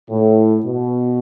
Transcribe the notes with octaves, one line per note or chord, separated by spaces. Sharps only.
A2
B2